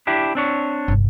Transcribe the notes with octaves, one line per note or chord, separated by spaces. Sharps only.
D4 E4 G4
C4 D4 C#5
G1 C2